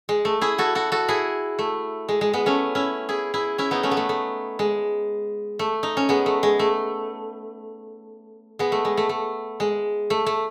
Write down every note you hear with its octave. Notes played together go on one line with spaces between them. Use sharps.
G#3
A3
E4 G#4
F#4 A4
F#4 A4
F#4 A4
E4 G#4
A3
G#3
G#3
G#3 B3
A3 C#4
C#4 E4
E4 G#4
E4 G#4
C#4 E4
B3 D#4
A3 C#4
B3
A3
A3
G#3
A3
D#4
C#4
G#3 B3
A3
G#3
A3
G#3 B3
A3
G#3
A3
A3
G#3
A3
A3